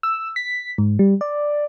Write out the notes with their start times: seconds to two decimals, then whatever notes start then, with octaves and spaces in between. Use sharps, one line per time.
0.03 E6
0.36 B6
0.78 G#2
0.99 G3
1.21 D5